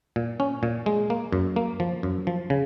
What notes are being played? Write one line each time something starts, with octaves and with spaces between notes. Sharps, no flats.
A#2
C#4
A#2
G#3
A#3
F#2
A#3
F3
F#2
F3
C#3